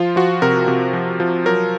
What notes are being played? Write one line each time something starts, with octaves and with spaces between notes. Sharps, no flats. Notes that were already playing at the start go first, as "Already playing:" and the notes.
Already playing: F3 F4
F3 F#4
C3 A#4
C3
F3
F3
F#3 A#4